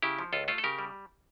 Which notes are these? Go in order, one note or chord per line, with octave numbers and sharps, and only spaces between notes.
C#3 E4 G4
F3
C#2 F4 A4
A3 F4 A4
A4
C#3 G4 A#4
G3